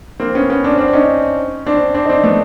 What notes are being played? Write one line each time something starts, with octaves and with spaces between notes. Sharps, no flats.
A#3 C4
B3 C#4
B3 C#4
C4 D4
C4 D4
D4
C#4 D#4
C4 D4
C4 D4
D#4
C4 D4
A3 B3